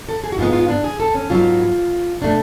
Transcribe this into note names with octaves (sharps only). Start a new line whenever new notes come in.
A4
G#4
F#4
G#2 G#3 B3 F4
F4
D4
G#4
A4
C#4
G#2 F#3 B3 F4
B2 A3 D4